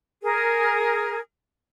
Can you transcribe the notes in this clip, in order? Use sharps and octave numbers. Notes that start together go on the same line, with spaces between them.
G#4 A#4